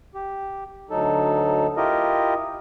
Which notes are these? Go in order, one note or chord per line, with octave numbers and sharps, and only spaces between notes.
G4
D2 F#3 D#4 A4
E4 F4 G4 A#4 D#5